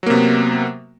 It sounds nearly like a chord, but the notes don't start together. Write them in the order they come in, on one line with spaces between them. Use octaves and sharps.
F#3 A#3 C3 B3